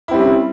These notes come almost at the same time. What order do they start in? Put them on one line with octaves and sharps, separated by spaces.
E4 C4 G3 C#4